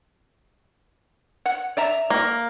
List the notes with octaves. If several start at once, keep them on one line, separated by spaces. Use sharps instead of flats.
F#5
D5 E5 A#5
A#3